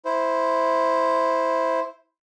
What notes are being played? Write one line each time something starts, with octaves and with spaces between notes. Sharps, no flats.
E4 C5